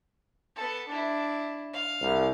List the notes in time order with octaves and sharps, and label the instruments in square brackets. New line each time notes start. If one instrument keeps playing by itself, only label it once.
[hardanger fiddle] B3 A4
D4 E4
F5
[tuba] C2